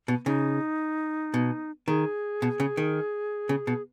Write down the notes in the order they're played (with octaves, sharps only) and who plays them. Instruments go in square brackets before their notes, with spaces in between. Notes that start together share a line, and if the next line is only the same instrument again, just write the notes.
[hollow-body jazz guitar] B2
[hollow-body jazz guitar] C#3 [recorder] D#4
[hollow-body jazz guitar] B2
[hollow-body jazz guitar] D#3 [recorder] G#4
[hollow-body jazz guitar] B2
C#3
D#3
C#3
B2